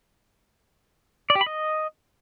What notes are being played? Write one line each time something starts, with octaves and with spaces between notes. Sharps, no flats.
D5
G4
B5
D#5